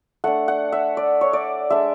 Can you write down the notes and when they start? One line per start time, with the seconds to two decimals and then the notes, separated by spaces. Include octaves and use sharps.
0.24 A3 D4 F#5
0.48 F#5
0.72 E5
0.97 D5
1.21 C#5
1.33 D5
1.70 G#3 D4 E5